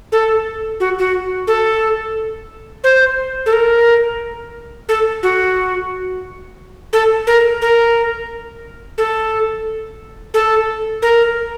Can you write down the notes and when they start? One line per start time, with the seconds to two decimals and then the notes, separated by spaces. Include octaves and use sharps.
0.12 A4
0.80 F#4
0.99 F#4
1.47 A4
2.84 C5
3.46 A4
3.53 A#4
4.89 A4
5.23 F#4
6.93 A4
7.27 A#4
7.62 A#4
8.98 A4
10.34 A4
11.02 A#4